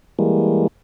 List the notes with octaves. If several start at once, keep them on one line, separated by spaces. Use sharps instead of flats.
E3 G3 G#3 A#3